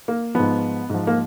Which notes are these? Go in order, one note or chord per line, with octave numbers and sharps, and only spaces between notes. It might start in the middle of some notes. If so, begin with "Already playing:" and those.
A#3
G#2 F3 B3
G#2 F3
A#3